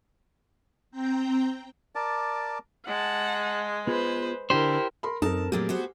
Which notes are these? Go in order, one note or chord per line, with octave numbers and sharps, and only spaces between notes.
C4 G5 A#5 G6
A#4 D5 A5 D6
G#3 F#5 A5
B3 F4 G#4 B4 C5
D3 D4 E4 G4 A#4 C5
A#4 B5 C6
F#2 C4 D#4 A4 A#4 A5
A#2 F#3 A3 A#3 G4 G#4
B3 F#4 C5